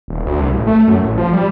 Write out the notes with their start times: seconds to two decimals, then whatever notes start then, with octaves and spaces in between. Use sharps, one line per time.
0.08 D#1
0.26 D2
0.40 C2
0.55 A1
0.67 A3
0.87 F#2
1.03 A1
1.17 F3
1.33 G3